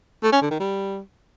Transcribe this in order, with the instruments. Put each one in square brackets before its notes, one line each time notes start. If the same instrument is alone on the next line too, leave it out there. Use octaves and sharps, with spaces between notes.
[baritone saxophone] A3
C#4
D3
D#3
G3